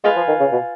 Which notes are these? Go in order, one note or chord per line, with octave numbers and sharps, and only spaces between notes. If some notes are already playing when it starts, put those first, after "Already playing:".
G#3 F4 B4 F5 G#5
F3
D#3
C#3
B2